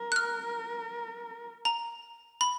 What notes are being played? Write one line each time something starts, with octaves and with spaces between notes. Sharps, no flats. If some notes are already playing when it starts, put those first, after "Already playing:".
Already playing: A#4
F#6
F6
A#5
B5